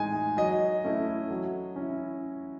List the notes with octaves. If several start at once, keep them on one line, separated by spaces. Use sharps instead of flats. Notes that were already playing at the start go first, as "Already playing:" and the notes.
Already playing: A2 G#3 D#4 G#5
F#3 D#5
A3 C#4 E4
F#3
C#4 E4